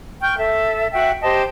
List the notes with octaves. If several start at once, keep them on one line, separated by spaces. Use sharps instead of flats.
G5 C#6 F6
A4 E5
F#4 E5 F#5 G5
G4 C5 D#5 A5